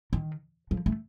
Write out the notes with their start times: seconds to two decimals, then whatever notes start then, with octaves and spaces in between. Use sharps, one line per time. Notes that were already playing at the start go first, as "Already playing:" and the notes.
0.13 D#3
0.71 F3
0.86 A3